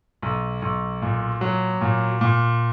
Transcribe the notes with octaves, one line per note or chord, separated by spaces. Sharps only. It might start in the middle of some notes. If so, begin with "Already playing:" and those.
B1
B1
A#2
F#3
A#2
A#2